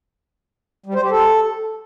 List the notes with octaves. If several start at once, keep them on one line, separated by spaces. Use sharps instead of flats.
G3
C5
G4
A4